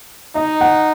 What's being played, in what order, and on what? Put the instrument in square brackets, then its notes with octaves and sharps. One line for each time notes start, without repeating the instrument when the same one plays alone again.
[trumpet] D#4 [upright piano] D#5
[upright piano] F#5